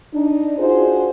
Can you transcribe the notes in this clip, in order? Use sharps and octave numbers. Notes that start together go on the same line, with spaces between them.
D4 D#4
D4 F4 F#4 G#4 C5